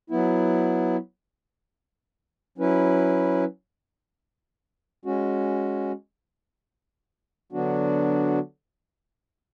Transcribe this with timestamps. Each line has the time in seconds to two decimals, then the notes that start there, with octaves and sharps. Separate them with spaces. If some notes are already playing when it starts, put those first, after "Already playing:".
0.10 F#3 B3 E4
2.58 F#3 C#4 E4 B4
5.05 G#3 C#4 F#4
7.52 D3 F#3 B3 D4 F#4